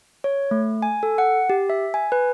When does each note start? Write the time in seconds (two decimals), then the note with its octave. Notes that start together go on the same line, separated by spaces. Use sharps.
0.24 C#5
0.51 A3
0.82 G#5
1.03 A4
1.18 F#5
1.50 G4
1.70 E5
1.94 G#5
2.12 B4